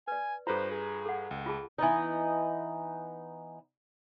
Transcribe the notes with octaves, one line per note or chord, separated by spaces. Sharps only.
B4 D5 G#5
G2 F4 A4 B4 C5 A#5
G#4
A4 F#5
C#2
F4 G#4 A5
E3 B3 D#4